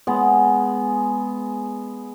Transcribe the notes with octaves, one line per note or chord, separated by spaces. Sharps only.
G#3 B3